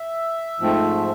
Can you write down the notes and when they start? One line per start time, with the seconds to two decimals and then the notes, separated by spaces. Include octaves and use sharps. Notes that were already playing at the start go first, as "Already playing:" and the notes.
Already playing: E5
0.60 G#2 F3 A3 C4